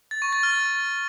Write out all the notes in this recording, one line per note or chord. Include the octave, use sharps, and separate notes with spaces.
A6
C#6
A6
F6